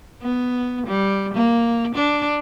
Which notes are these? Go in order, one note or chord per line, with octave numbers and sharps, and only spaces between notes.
B3
G3
A#3
D4